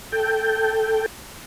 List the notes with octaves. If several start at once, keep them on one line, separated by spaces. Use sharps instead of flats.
A4 G5